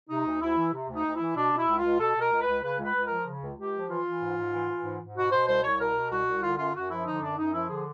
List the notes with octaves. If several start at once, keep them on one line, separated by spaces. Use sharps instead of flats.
C3 D#4
D2
D2 E4
E3
C3
D2
D#4
D2
E4
E3
B2 D4
B2
E4
C#2
F4
C#2
B2 A4
B2
A#4
C#2
B4
C#2
C#3 B4
C#2
B4
C#2
F3 A#4
C#3
C#2
C#2 G4
F3
E3 F4
E3
G#2
G#2
E3
E3
G#2
G#2
B2 F#4
B2 C5
C2 C5
C2 C#5
B2 A#4
B2
C2 F#4
C2
D3 F4
F#2 F4
F#2 F#4
F3 E4
D3 D#4
F#2 D4
F#2 D#4
F3 E4
D3 G#4